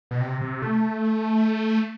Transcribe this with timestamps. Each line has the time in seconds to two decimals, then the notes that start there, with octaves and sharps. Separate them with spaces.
0.11 B2
0.21 C3
0.41 C3
0.62 A3